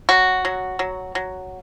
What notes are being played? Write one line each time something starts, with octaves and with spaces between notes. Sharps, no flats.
F#3 F#4
F#3
F#3
F#3